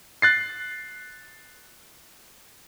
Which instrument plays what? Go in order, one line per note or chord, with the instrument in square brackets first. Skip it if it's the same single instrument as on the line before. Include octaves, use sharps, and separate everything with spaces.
[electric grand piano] F#6 A6 C7